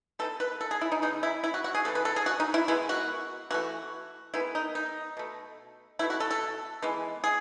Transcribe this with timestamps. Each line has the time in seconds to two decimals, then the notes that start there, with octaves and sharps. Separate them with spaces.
0.19 D#3 G#3 B3 A4
0.40 B4
0.61 A4
0.71 G#4
0.81 E4
0.92 D#4
1.02 C#3 G#3 B3 D#4
1.23 E4
1.44 E4
1.54 F#4
1.64 F#4
1.75 G#4
1.85 C#3 E3 A3 A4
1.95 B4
2.05 A4
2.16 G#4
2.26 F#4
2.40 D#4
2.54 E4
2.68 D#3 G#3 B3 E4
2.89 F#4
3.51 E3 A3 F#4
4.34 D#3 G#3 B3 E4
4.55 D#4
4.75 D#4
5.17 B2 A3
5.99 A3 E4
6.02 B2
6.10 F#4
6.20 A4
6.31 A4
6.82 E3 G#3 B3
7.24 G#4